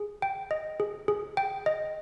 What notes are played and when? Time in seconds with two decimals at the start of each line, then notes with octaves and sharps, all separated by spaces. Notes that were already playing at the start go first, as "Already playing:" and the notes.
Already playing: G#4
0.22 G5
0.51 D#5
0.80 G#4
1.08 G#4
1.37 G5
1.66 D#5